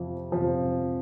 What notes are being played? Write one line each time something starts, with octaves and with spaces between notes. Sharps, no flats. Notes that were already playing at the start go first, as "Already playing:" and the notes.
Already playing: F2 C3 F3
F2 C3 F3